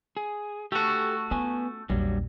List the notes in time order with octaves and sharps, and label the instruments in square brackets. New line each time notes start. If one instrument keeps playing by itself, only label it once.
[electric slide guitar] G#4
[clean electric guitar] A3 F#4 [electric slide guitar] G4 A4
[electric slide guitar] B3 G#5 [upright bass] C#4 F4
[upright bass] A#1 E2 [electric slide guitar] G2 F#3 G3